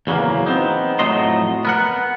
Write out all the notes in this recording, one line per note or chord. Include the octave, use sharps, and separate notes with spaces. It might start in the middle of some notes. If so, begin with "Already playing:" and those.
E2 C#3 F#3 G#3 A#3
B3 C4 D#4
F2 A2 F#3 A3 D#5 C6
B3 A#4 F#5